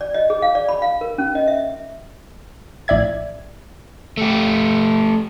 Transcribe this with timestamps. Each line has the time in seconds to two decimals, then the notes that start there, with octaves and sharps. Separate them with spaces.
0.01 D5
0.14 D#5
0.30 G#4
0.42 F5
0.55 D5
0.69 B5
0.82 F5
1.01 A#4
1.18 C#4
1.35 D#5
1.48 E5
2.88 A#1 A2 D5 E5 G#6
4.17 A3 G4